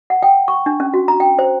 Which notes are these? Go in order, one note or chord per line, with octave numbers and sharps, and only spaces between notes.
F#5
G5
C#6
D4
C#4
F#4
A#5
G5
C5